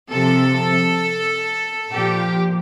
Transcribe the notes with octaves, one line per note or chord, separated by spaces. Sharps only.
C3 F3 A4
A#2 F3 G4